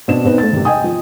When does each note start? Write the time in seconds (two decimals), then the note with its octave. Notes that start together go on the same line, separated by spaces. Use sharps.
0.08 B2 C4 D4 E7
0.25 B2 C4 D#4 B4
0.38 A3 A6
0.52 E1 C3
0.65 D#5 G5 G#5 D#6
0.84 F3